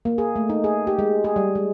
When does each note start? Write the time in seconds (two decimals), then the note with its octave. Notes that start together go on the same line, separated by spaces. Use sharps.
0.05 A#3
0.18 G#4
0.36 A3
0.49 D#4
0.64 G#4
0.87 G4
0.99 G#3
1.24 G#4
1.36 G3
1.55 G#3